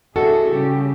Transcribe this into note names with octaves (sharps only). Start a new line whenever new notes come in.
D4 E4 F#4 G#4 A4
C#3 G3 G4